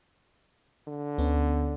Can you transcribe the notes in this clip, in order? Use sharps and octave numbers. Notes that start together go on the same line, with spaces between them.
D3
D2 B3 C#4